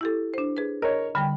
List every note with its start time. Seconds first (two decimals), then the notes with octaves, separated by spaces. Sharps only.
0.01 E4 G4 A4
0.34 D4 C5
0.57 G#4 B4
0.82 A#4 C#5 D#5
1.15 D3 G3 G5 B5